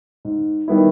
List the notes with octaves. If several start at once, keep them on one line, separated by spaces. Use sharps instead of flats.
G#2
D#3 G3 B3 E4